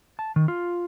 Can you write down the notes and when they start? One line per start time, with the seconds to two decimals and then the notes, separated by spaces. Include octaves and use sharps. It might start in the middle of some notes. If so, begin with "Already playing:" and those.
0.19 A5
0.36 D#3
0.48 F4